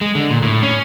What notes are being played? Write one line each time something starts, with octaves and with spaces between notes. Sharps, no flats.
G#3
D3
A#2
A2
C#4